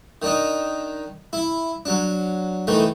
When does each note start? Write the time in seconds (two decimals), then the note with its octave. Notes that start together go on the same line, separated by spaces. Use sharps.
0.22 D#3 D4 D#4
1.33 E4
1.85 F#3 D4
2.67 D#3 E3 A3